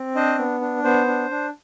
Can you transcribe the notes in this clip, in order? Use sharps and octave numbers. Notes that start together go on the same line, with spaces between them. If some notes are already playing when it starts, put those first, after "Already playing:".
Already playing: C4
D4 C5 D#5
B3
D4
B3 C5
D4
D4